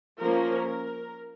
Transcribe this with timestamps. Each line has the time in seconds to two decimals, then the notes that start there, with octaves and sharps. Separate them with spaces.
0.19 F3 A#3 C#4 A#4
0.68 A#4